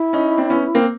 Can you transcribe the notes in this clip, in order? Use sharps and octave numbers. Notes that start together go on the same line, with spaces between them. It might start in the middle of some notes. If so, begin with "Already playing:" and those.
Already playing: E4
C#4 D#4
C4 D4
B3 C#4
A#3 C4